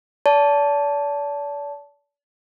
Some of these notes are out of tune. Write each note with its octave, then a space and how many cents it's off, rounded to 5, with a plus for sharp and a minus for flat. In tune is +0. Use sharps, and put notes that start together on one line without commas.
D5 -40 A5 -5